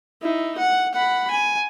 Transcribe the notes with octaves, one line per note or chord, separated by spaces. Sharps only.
D#4 E4
F#5
F#5 B5
G#5